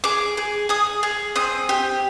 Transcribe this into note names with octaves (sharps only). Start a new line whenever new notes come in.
G#4 D6
G#4
G#4 D#6
G#4
C4 D#6
G4